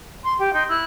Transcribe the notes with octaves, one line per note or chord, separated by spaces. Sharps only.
C6
G4
D#4 C6 G6
E4 E6 F#6